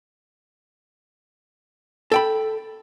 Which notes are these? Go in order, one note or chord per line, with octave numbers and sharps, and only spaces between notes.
A4 G5 B5